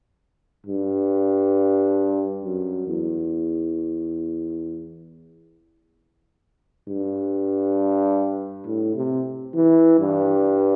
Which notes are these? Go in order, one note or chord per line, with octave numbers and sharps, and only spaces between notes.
G2
F#2
E2
G2
A2
C3
E3
G2